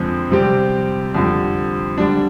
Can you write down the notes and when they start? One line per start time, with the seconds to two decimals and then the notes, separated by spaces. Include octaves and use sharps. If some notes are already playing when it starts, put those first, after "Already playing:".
Already playing: F2 D3 F3 G#3 C4
0.31 C3 G3 C4 G4
1.14 F2 D3 G3
1.98 D3 G3 D4